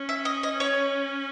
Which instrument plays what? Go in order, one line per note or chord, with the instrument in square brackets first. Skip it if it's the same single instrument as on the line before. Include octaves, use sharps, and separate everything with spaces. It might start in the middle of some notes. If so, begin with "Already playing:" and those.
Already playing: [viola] C#4
[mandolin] E5
D#5
D#5
C#5